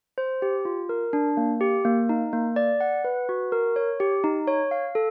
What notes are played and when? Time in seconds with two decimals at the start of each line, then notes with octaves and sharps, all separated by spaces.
0.18 C5
0.42 G4
0.65 F4
0.89 A#4
1.13 D4
1.37 A#3
1.61 G4
1.85 A#3
2.09 D#4
2.33 A#3
2.56 D5
2.80 F#5
3.04 B4
3.29 F#4
3.52 A#4
3.76 C#5
4.00 G4
4.24 D#4
4.48 C#5
4.71 F5
4.95 A4